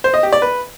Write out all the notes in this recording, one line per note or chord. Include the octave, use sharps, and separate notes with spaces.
C5
D#5
G4
D5
B4